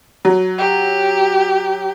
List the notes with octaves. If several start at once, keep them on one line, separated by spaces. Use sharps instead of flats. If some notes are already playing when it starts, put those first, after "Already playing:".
F#3
G4